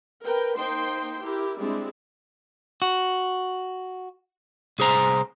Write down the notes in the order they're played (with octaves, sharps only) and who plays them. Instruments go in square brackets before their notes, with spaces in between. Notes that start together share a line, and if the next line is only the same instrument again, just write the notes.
[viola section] A#4 B4 G5
A#3 D#4 C5 G5 C6
E4 G4 A#4
G3 G#3 C4 D4 E4
[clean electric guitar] F#4
C2 G#4 C5 A#5